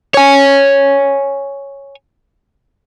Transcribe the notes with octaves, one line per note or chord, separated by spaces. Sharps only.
C#5 G#5